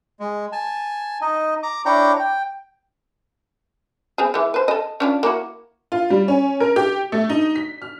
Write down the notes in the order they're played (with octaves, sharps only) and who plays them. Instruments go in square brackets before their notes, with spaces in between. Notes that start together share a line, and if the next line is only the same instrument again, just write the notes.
[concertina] G#3
G#5 A5
D#4 D#5
A#5 D6
D4 E4 C#5 G5 A#5 D6
G5
[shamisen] B3 C4 G#4
E3 G#3
B4 C5
A4 D#5
C#4 D4 F4
A#3 E4 F#4
[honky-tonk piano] F4
G3
C#4
A#4
G4
A3
D#4
B6
F6